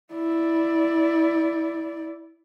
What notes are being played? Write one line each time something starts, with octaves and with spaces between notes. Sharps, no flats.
E4 D5